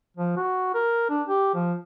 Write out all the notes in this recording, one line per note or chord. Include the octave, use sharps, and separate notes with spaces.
F3
F#4
A#4
D4
G4
F3